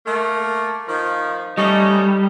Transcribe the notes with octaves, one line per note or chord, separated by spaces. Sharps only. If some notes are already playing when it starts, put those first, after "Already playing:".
A3 A#3
D#3 F3
G3 A3 C#4 D#4